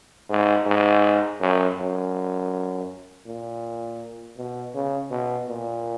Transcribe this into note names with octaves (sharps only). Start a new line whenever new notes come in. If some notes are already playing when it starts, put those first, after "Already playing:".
G#2
G#2
F#2
F#2
A#2
B2
C#3
B2
A#2